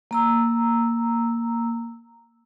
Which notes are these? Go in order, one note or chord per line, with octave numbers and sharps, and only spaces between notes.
A#3 A#5 E6